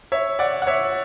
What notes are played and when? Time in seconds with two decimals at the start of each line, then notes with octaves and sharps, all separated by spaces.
0.12 C#5 E5
0.39 D5 F#5
0.62 F#5
0.67 C#5 E5